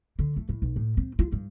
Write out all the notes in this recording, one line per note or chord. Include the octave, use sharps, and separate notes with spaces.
D3
A3
A2
B1
A2
C4
F4
G2